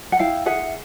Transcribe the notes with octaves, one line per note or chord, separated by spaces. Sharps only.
F#5
E4 F5 G5
G#4 E5 F#5